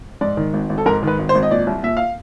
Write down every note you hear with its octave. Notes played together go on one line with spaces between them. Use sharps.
G#2 D5
D#3
G#1
G#1
A4
G#2 A#4
D#3 B4
G#1
C5
G#1
D#5
A#2 D5
C2
A#2 E5
F5